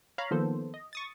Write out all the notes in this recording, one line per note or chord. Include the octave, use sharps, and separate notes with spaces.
C#5 F5 A#5 B5
D#3 F3 A#3 B3 A4 C5
D#5
C#6 D#6 A6